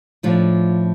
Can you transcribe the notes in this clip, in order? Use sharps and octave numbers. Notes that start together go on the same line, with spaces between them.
A2 F3 D4 F4